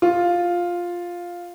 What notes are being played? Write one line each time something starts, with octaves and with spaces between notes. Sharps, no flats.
F4